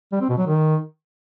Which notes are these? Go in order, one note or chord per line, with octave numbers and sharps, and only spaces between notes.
G3
C4
B2
F#3
D#3